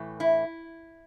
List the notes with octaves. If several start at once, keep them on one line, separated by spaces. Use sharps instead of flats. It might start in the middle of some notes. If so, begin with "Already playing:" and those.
Already playing: A2 E3 A3
E4